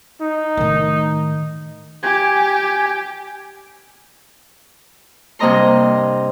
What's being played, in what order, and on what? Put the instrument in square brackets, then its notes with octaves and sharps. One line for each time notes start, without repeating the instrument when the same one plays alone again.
[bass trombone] D#4
[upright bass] A2 D#3
[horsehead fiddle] G4 [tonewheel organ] G#5
[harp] G2 C3 A#3 D#5 A#5 C6